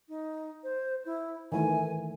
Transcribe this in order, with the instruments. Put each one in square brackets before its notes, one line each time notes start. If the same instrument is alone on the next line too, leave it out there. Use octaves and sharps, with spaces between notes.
[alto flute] D#4
C5
E4
[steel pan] D#3 E3 A3 [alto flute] G#5